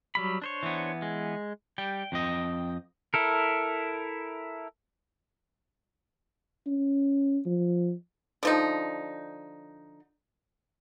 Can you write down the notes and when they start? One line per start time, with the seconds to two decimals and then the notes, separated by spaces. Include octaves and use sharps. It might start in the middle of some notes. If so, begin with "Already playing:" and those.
0.15 F#3 G3 B5
0.42 D4 C5 C#5
0.63 E3 B3
1.02 G#3
1.78 G3 G5
2.12 F2 C4 D#5
3.14 E4 A4 A#4
6.66 C#4
7.46 F3
8.43 D3 F3 D#4